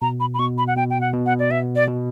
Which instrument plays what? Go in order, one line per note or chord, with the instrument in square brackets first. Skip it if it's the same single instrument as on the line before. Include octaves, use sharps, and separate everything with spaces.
[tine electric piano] B2 [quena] A#5
[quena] B5
B5
[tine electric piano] B2 [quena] C#6
[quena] B5
F#5
[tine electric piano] B2 [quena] G5
[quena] G5
F#5
[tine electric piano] B2
[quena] F#5
D5
[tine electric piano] B3 [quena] E5
[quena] D5
[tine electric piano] B2